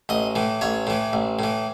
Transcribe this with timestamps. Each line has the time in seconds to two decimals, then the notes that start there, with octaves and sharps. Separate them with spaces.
0.09 A1 D#5
0.35 A2 E3
0.61 A1 C#5
0.87 A2 E3
1.13 A1
1.39 A2 E3